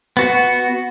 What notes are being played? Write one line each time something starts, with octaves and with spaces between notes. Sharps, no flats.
B3 F#4